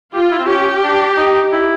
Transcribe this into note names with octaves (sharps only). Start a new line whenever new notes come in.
F4 G4
E4
C4
C#4 G4
D4
D#4
E4